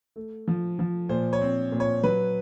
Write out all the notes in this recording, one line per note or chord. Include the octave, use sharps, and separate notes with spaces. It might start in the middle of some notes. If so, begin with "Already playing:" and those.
A3
F3
F3
A#2 C5
C#5
C4
A#2
C#5
F#3 B4